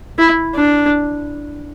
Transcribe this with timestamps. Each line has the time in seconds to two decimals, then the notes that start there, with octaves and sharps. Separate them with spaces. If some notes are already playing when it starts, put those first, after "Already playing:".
0.18 E4
0.55 D4